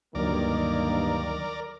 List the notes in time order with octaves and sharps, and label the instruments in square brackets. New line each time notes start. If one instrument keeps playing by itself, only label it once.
[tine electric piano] D2 D3 F#3 [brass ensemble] G2 A#3 [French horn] D#3 [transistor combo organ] A#4 D5